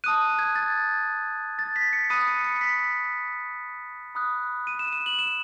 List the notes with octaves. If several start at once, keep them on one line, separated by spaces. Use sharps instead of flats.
A5 D#6 F#6 D#7
G#6
A6
A6
B6
C#7
B5 D#6 F#6 D#7
C#7
C#7
B6
B5 D#6 F#6
D#7
E7
E7
F#7
E7